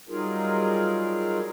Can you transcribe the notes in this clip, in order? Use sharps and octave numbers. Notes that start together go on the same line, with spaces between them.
F#3 G3 D#4 F4 G#4 A#4